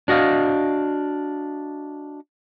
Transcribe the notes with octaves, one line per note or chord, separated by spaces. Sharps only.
D4 F#4 D#5 F5